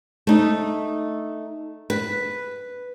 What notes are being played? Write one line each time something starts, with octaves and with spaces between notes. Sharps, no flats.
A3 D#4
B4